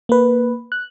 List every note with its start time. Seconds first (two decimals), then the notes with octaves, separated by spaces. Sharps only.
0.09 A#3 B4
0.72 F#6